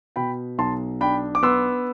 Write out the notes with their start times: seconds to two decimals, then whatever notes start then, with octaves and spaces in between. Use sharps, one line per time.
0.16 B2 G5 B5
0.58 B1 A5 C6
1.01 D4 G5 B5
1.35 D6
1.43 B3 C6 E6